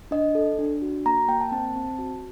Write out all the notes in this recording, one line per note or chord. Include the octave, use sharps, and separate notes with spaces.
D4 D#5
A4
D4
F#4
A#3 A#5
A#3 G5
A5
C4 A5
C4
F#4